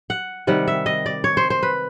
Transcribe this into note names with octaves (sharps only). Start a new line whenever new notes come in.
F#5
C3 D#3 G3 F#5
E5
D#5
D5
C#5
C5
C5
B4